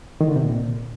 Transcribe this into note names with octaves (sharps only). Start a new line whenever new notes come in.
D#3
D3
C3
A#2